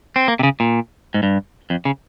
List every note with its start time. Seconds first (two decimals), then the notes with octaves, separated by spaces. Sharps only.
0.16 C4
0.28 A#3
0.39 C3
0.43 C#3
0.60 A#2
1.14 G#2
1.23 G2
1.70 F2
1.85 C#3